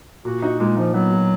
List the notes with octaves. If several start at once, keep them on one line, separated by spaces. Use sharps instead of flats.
A#2 F#4
D#4 F#4
A#2 G#3
F3 D#4
F#3 B3
A#2